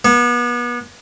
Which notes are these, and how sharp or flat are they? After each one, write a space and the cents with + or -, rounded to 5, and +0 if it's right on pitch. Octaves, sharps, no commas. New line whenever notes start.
B3 -35